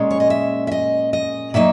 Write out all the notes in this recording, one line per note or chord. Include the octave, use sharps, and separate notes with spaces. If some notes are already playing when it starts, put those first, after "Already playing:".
Already playing: A#2 G#3 C#4
C#5
D#5
E5
E5
D#5
D#5
A#2 F#3 A#3 D#4 E5